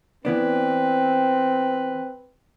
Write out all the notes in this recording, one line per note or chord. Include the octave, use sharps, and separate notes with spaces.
E3 B3 C4 D4 B4